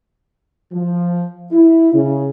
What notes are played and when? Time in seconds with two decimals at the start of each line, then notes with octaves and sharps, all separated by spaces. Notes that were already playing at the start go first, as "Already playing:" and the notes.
0.73 F3
1.52 E4
1.93 C#3